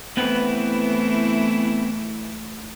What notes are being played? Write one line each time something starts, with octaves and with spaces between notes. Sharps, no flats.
E3 A3 B3 C4 E4 B4